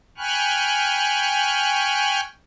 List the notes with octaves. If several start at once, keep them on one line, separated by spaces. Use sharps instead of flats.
G5 G#5 B5 C#6 F6 F#6